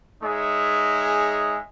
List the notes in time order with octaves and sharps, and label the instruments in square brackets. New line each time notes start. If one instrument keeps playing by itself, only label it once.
[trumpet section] G#3 D#4 G#4 C#5 E5